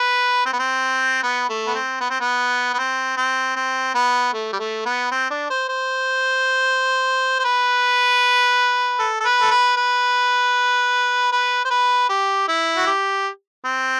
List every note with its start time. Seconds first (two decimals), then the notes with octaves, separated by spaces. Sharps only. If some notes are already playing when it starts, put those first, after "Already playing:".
Already playing: B4
0.46 C4
0.53 B3
0.59 C4
1.23 B3
1.49 A3
1.67 B3
1.75 C4
2.01 B3
2.10 C4
2.20 B3
2.73 B3
2.79 C4
3.17 C4
3.56 C4
3.95 B3
4.33 A3
4.53 G3
4.59 A3
4.85 B3
5.11 C4
5.30 D4
5.50 C5
5.69 C5
7.39 C5
7.45 B4
8.99 A4
9.20 A4
9.25 B4
9.41 A4
9.51 B4
9.77 B4
11.32 B4
11.65 C5
11.70 B4
12.09 G4
12.48 E4
12.77 F#4
12.87 G4
13.65 C4